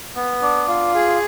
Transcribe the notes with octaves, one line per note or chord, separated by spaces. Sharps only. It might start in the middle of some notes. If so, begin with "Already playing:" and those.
B3
D4
F4
G#4